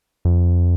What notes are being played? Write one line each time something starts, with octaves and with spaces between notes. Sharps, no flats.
F2